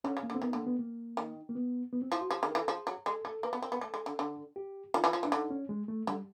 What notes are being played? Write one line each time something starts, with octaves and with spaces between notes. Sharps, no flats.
D3 C#4
C#3
A#3
D3
C4
D#3 B3
D3 A#3
B3
A#3
D#3
A#3
B3
B3
C4
F3 E4
F#4
F3 G4
D#3 G#4
A#4
E3 A4
F3 G#4
F#3
G#3 A4
A3 A4
A#3 B4
B3
C4 A#4
B3
A3 A4
G#3
D3
D3
G4
D#3 F4
E3
F3
E3 D4
D3 D#4
C#4
G#3
A3
D3 G3